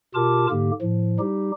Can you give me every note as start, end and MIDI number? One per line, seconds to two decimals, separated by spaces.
0.15 0.47 47
0.15 0.47 65
0.15 0.47 67
0.15 0.47 70
0.15 0.47 81
0.15 0.47 86
0.50 0.71 44
0.50 0.71 50
0.50 0.71 58
0.50 0.71 67
0.82 1.18 45
0.82 1.18 53
1.19 1.51 55
1.19 1.51 63
1.19 1.51 67